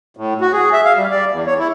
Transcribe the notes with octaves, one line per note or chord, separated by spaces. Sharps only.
A2
F#4
G#4
E5
F5
G3
D5
E2
C#5
E4